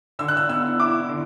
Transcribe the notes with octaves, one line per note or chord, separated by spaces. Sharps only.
D3 E6
F#6
E6
B3 E6
E4 D6
D3